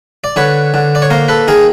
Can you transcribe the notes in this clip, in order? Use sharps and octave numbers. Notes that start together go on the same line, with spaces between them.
D5
D3 B4 C#5
D3
D5
C#5
A#3 A#4 C5
A4 B4
D#3 G#4 A#4